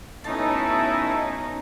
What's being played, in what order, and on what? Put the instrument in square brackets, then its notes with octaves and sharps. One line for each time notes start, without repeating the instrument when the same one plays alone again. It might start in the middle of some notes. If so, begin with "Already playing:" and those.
[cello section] B2 C#4 D#4 [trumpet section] A3 E4 [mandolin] A5